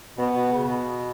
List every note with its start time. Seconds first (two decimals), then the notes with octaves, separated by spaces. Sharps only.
0.18 B2 B3
0.35 B2
0.52 C#3
0.68 B2